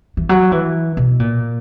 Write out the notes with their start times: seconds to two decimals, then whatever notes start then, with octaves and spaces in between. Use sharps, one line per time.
0.17 E3
0.29 F#3
0.52 E3
0.97 B2
1.20 A#2